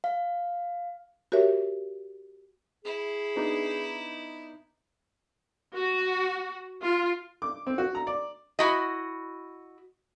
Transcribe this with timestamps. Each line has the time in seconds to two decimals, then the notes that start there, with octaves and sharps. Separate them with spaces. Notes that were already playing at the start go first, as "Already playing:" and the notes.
0.04 F5
1.32 F#4 G4 A#4 C#5 E5
2.85 E4 G#4
3.36 B3 D4 D#4
5.74 F#4
6.83 F4
7.42 D6
7.67 C4
7.78 F#4
7.95 A#5
8.07 D5
8.59 E4 F#4 D#5